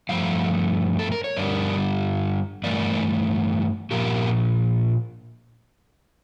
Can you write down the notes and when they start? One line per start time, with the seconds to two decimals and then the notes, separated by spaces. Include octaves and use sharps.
0.09 G2 F3 A3 F5
0.99 A4
1.12 A#4
1.24 C#5
1.37 G2 D3 G3 A#4 D5
2.64 G2 E3 A3 A#4 D5
3.91 A#2 F3 G4 A#4